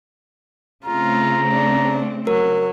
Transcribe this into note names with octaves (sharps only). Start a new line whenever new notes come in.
C#3 A3 C4 F4 A#5
D4
F#3 A#4